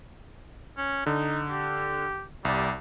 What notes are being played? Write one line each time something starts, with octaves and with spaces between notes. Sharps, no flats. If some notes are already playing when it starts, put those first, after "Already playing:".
C#4
D3 D#4
G4
C2 G3